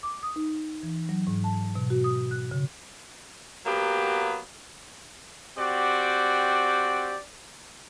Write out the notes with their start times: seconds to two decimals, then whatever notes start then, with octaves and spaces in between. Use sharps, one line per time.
0.03 D6
0.23 D#6
0.36 D#4
0.83 E3
1.09 F#3
1.27 G#2
1.44 A5
1.75 B2
1.90 F#4
2.04 D#6
2.31 F#6
2.51 C#3
3.66 F#3 A#3 B3 G4
5.56 C4 F#4 G4 D5